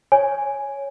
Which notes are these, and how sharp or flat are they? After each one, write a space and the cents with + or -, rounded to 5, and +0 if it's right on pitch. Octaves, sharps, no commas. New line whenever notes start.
C#5 +0 G#5 +0